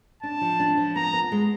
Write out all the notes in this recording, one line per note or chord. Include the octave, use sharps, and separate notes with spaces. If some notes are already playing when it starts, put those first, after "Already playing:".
D4 A5
F3
D4
F3
B3 A#5
B3
G#3